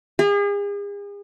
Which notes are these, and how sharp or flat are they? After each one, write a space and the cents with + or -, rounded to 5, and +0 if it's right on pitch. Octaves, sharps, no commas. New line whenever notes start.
G#4 -40